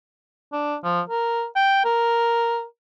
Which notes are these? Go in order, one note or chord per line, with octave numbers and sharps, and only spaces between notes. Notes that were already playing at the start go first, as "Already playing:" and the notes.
D4
F3
A#4
G5
A#4